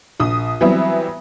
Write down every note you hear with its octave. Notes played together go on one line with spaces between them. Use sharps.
A#1 D#6
E3 F#3 G3 B3 C4 E5